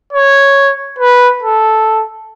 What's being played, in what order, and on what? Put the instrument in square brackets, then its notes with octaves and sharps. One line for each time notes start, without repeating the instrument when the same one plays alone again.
[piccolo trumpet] C#5
B4
A4